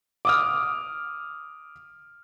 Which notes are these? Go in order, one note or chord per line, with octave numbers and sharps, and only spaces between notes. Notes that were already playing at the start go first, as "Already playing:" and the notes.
D6 D#6 F6